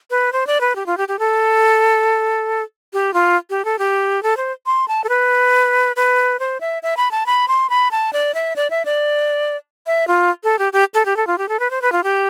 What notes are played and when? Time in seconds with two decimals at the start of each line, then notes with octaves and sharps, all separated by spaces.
0.10 B4
0.33 C5
0.47 D5
0.61 B4
0.76 G4
0.86 F4
0.97 G4
1.08 G4
1.19 A4
2.93 G4
3.14 F4
3.50 G4
3.65 A4
3.79 G4
4.23 A4
4.37 C5
4.66 C6
4.88 A5
5.04 A4
5.09 B4
5.96 B4
6.40 C5
6.61 E5
6.83 E5
6.97 B5
7.11 A5
7.26 B5
7.48 C6
7.70 B5
7.91 A5
8.13 D5
8.35 E5
8.56 D5
8.70 E5
8.85 D5
9.87 E5
10.08 F4
10.44 A4
10.59 G4
10.73 G4
10.94 A4
11.05 G4
11.17 A4
11.27 F4
11.38 G4
11.49 A4
11.60 B4
11.71 C5
11.82 B4
11.92 F4
12.04 G4